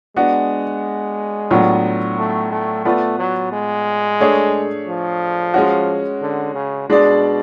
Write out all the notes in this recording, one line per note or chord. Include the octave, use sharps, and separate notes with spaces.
G#3 B3 D4 F#4
A2 F#3 B3 D4 F4
A3
A3
A3 B3 F4 B4 D5
F#3
G#3
A3 D4 G#4 C#5
F3
G#3 C#4 F#4
D3
C#3
B2 G#3 D4 G#4 D5